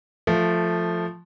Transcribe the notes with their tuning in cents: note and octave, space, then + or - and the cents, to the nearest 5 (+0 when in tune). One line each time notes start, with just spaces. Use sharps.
F3 +0 A3 +0